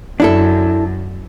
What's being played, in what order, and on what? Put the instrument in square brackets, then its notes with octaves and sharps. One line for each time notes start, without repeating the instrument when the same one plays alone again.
[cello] F#2 [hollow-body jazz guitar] D4 E4 A4